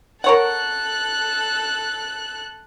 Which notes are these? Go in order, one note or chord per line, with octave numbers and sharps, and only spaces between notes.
A4 A#4 C#5 F#5 F#6